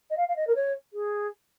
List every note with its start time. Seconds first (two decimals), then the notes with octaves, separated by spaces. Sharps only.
0.10 D#5
0.17 F5
0.28 F5
0.36 D#5
0.47 A#4
0.55 C#5
0.93 G#4